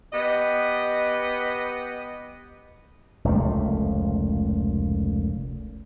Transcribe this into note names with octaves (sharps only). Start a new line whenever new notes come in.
B3 G4 D#5
F1 C#2 A#2 A3